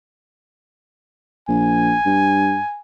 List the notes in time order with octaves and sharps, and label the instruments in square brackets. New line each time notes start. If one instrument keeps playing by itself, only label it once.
[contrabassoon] A#1 [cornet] G#5
[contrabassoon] G2